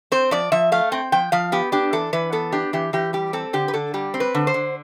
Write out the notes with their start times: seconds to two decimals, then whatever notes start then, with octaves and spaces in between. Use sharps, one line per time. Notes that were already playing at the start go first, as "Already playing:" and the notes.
0.12 C4 C5
0.31 F3 D5
0.52 F3 E5
0.72 A3 F5
0.92 C4 G5
1.12 F3 G5
1.32 F3 F5
1.52 B3 G4
1.72 D4 G4
1.93 E3 A4
2.13 E3 B4
2.32 B3 A4
2.52 D4 G4
2.73 E3 G4
2.93 E3 G4
3.13 G3 G4
3.33 C4 A4
3.53 D3 G4
3.68 B4
3.73 D3 A4
3.94 G3 G4
4.14 C4
4.20 B4
4.35 D3
4.47 C5
4.54 D3